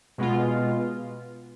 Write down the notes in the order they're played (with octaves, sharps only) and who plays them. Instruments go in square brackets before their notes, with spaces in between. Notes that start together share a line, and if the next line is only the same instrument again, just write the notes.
[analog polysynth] B2 G#3 B3 F4